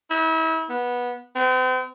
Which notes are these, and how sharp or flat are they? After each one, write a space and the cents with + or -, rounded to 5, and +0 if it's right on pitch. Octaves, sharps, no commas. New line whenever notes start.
E4 -35
B3 -15
C4 -40